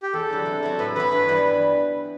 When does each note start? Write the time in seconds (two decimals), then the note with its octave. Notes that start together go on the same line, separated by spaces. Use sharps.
0.02 G4
0.13 E2 A4
0.30 D3 F#3
0.46 C3
0.63 F#3 C4 E4
0.79 A2 B4
0.95 E3 B3 B4
1.12 G2
1.28 E3 G3